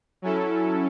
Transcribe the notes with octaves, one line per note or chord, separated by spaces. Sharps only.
F#3 C#4 E4 A4